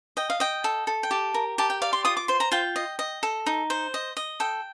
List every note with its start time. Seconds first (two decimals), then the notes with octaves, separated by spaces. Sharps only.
0.17 D#5 G5
0.30 F5
0.40 D#5 G5
0.64 A4
0.87 A4
1.03 G5
1.11 G4 A5
1.34 A#4
1.58 G4 A5
1.70 G5
1.82 D5 F5
1.93 C6
2.05 F4 D#6
2.17 D6
2.28 C5 C6
2.40 A#5
2.52 F4 G5
2.76 D#5
2.99 D#5
3.23 A4
3.46 D#4
3.70 C5
3.94 D#5
4.17 D#5
4.40 A4 G5